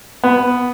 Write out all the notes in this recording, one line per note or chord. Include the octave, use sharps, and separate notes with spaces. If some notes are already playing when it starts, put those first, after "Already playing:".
B3